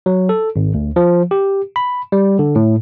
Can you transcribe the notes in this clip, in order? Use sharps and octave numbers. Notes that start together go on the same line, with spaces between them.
F#3
A4
G#1
D2
F3
G4
B5
G3
D3
A2